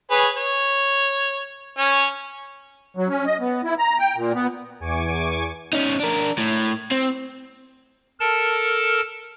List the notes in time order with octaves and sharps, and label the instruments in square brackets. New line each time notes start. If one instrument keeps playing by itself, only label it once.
[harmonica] G#4 B4 C#5
C#5
C#4 C#5
[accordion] F#3
C#4
D#5
B3
E4
A#5
G5
A#2
B3
[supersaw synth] E2 G#5 C#6 D6
[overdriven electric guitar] C#4 D#4
D4 A#4
A2
C4
[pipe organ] A4 A#4 A5